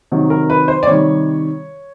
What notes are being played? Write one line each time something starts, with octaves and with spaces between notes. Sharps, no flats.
C3 D#3 F#3
A#4
B4
C5
D5
C3 D#3 G3 C#5